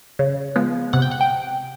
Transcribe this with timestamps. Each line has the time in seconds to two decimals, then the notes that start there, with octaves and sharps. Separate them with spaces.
0.19 C#3
0.56 F3 G#3 B3
0.93 C3 F#5
1.02 G5
1.11 F#5
1.21 G5